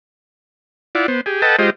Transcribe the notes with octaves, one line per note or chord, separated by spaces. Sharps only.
E4 F4 D5 F#5
B3 C5
G4 G#4
A4 B4 D#5 F#5 G5 A5
G#3 F4 G4 C5 D#5